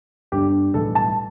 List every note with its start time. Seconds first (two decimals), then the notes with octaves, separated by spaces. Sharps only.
0.32 G1 G2 D3 G4
0.74 B1 A2 E3 G3 A4
0.95 A5